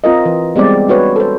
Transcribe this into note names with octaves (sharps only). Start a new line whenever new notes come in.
C4 F4 A#4 D#5
E3
G3 G#3 B3 C4 D5
D4 F#4 B4 C#5
A4 C5